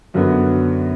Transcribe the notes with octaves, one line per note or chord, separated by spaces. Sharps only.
F#2 D3 F#3 B3 F#4